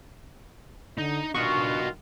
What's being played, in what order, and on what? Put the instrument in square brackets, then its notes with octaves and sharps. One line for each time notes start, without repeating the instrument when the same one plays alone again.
[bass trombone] D3 [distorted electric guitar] D#4
[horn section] G2 D#3 F4 [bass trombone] D4 [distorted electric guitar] F#4 D#5 [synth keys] C#6